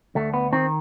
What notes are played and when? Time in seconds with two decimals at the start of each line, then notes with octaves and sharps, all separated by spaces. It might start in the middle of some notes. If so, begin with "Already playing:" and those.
0.15 D2 A3
0.34 B3
0.53 D#3 C4